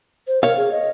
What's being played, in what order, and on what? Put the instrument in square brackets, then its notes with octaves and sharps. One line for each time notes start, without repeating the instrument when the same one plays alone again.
[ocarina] C5
[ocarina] A#4 [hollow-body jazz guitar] C#5 F5
[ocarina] G#4
D#5